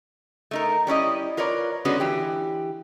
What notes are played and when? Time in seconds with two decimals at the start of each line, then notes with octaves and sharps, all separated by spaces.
0.51 A3 D#4 A#4
0.87 G3 C#4 E4 D#5
1.37 F4 A#4 B4 C#5 D5
1.85 D3 G#3 B3 C#4 F#4 G#4
2.00 E3 G4